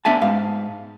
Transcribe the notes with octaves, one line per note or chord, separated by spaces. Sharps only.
B3 D4 E5 G#5 A5
G#2 F5